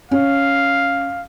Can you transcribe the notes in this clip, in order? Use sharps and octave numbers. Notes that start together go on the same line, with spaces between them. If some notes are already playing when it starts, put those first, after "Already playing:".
C#4 F5